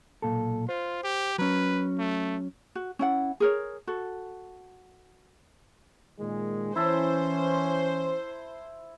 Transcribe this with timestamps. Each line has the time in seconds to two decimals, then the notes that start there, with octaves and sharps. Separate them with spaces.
0.22 B1 A#2 A4
0.69 F4 C5
1.04 G4
1.38 F#3 C#4 B4
1.99 A3
2.75 F#4
2.99 C#4 E4 F#5
3.40 G#4 A#4 C#5
3.87 F#4 A4
6.20 A#2 D#3 G#3
6.76 E3 C#4 E4 C5 E5 A5